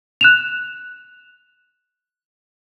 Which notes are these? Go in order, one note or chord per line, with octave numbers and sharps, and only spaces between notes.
F#6 E7 F7